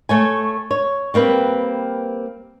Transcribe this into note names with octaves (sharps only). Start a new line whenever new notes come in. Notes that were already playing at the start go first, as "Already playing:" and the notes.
A3 C#5 G#5
C#5
G3 A#3 C4 B4